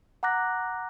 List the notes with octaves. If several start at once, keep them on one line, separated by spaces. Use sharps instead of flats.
F#5 A#5 D6 F#6 A#6